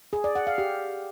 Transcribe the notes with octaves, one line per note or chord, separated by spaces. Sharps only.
G#4
D5
F#5
F5
G4